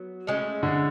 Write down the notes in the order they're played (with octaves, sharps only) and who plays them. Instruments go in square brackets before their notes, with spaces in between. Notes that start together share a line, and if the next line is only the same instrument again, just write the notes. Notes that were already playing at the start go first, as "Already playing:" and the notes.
Already playing: [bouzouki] F#3 B3
A2 G#3 C#4
[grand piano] D3